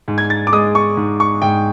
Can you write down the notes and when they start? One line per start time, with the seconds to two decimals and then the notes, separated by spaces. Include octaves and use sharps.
0.08 G#2
0.18 G#6
0.30 A6
0.47 D6
0.52 G#3 D#6
0.75 C#6
0.97 G#2
1.20 C#6
1.42 G#2 G5